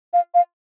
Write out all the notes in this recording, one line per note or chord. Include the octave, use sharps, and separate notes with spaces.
F5
F5